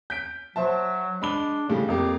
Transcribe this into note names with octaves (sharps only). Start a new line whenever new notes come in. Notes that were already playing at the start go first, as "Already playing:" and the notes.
G6 B6 D7
F#3 C5 E5 A5
G#3 D4 B5 G7
A2 C#3 G3
F2 A#3 G4